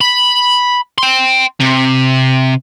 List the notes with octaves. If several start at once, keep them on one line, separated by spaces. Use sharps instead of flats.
B5
G5 C6
C3